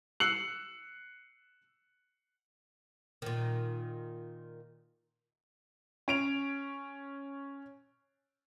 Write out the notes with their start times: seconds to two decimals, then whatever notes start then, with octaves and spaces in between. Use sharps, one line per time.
0.20 E6 F#6 C7 C#7 F#7
3.22 A#2 D#3
6.08 C#4 D7 F7